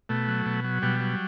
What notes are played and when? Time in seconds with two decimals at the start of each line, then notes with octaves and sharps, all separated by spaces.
0.09 B2 A3
0.28 F#3
0.46 B2
0.64 F#3
0.82 B2 G3
1.00 F#3